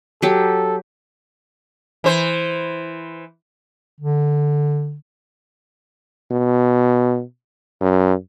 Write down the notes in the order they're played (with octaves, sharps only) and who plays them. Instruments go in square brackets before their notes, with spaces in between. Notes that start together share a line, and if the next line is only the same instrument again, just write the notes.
[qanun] F#3 G4 [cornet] A4
[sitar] E3 C5
[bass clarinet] D3
[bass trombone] B2
F#2